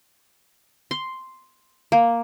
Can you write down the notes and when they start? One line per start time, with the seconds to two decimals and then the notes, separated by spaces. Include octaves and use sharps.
0.91 C6
1.92 A#3